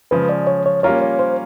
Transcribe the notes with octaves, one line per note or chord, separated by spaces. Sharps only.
C#3 F3 G#3 B4
D5
C#5
C#5
G3 A#3 C#4 F4 A#4 C#5
C#5
C5